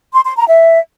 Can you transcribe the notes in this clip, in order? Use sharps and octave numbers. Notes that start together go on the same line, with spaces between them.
C6
C6
A#5
E5